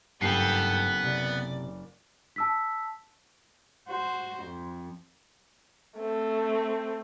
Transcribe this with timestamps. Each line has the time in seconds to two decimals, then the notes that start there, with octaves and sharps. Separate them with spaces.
0.21 F#1 G2 B3 G4 A4 C7
1.04 C3 D5
2.36 A5 E6 B6
3.89 F#4 C5
4.43 F2
5.98 A3 C4